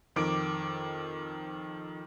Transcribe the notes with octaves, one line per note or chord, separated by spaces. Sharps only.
F2 D#3 D6 D7